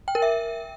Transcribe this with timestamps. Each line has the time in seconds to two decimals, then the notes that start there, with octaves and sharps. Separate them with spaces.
0.08 G5
0.15 A#4
0.22 E5